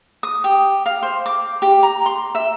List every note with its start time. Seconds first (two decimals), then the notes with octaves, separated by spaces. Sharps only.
0.23 D#6
0.44 G4
0.86 F5
1.02 C5
1.26 D6
1.62 G4
1.83 A#5
2.06 C6
2.35 E5